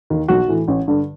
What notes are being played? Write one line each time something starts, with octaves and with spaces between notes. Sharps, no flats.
D#2 D#3
B1 F#4
A2 E3
A1
G2 D3